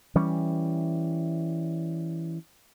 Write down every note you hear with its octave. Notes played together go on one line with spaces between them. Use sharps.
E3 G3 C#4